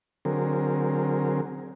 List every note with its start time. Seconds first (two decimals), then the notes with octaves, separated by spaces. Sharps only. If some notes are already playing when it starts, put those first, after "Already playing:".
0.25 D3 F#3 C4 G#4 A#4